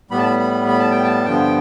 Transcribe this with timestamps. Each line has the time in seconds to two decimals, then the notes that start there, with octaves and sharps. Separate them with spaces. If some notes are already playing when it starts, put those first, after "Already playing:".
0.11 A2 G3 B3 B5
0.18 A5
0.25 B5
0.40 B5
0.68 B5
0.79 A5
0.91 G5
1.03 A5
1.25 G2 D3 F3 B3 G5